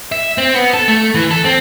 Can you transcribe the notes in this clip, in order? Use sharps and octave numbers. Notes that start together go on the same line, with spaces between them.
E5
C4
B3
A4
A3
E3
A4
C4